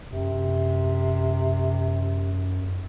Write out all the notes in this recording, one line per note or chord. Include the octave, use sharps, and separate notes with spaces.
F#2 C3